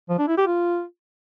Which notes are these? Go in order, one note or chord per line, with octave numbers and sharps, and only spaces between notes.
F3
D4
E4
G4
F4